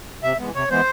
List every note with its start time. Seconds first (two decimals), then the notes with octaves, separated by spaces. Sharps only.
0.23 C3 E5
0.39 E3 G#3 B3
0.54 C3 C#5
0.70 E3 G#3 B3 C5